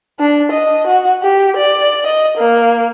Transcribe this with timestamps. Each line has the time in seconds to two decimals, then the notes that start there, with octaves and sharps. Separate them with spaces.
0.20 D4
0.52 D#5
0.87 F#4
1.23 G4
1.57 D5
2.07 D#5
2.37 A#3